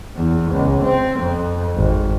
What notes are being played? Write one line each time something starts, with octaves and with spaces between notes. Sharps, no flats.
E2
C#2
C4
F2
G#1